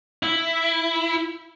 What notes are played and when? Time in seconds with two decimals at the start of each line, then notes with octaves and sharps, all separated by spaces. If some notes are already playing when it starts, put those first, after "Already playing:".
0.23 E4